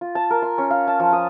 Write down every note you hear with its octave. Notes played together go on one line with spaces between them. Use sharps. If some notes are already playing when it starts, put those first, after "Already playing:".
F4
A5
A#4
C6
C#4
F5
A5
F3
D#6